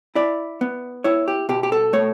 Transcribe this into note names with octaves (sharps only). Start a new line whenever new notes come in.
E4 D5
B3
E4 C#5
G4
B2 G4
G4
A4
A3 C#5